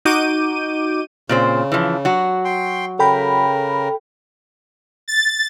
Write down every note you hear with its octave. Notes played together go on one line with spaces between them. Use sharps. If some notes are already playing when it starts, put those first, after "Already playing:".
D#4 F#4 D6 G6 D#7
A#2 C#3 C4 C5
E3 F3
F#3 F#4
G5 C6
C#3 A4 A#4 G5 B5
A6